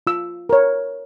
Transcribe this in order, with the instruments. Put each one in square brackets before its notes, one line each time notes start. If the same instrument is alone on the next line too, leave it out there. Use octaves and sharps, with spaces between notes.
[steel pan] F4 E6
A#4 C#5